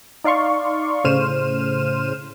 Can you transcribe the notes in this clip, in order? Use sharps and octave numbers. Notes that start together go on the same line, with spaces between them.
D#4 D5 F5 C6 C#6
A2 C#3 C5 F6 D#7 E7